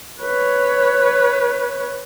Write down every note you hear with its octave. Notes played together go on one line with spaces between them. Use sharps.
B4 C#5